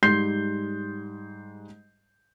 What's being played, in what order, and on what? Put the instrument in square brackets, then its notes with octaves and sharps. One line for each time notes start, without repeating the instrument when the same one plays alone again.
[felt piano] G#2 G3 C6 G6 C7